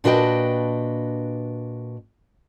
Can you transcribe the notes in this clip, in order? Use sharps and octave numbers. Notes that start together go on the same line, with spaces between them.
A#2 D4 F#4 B4 D#5 G5